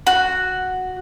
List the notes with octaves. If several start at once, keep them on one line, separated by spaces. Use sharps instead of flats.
F#4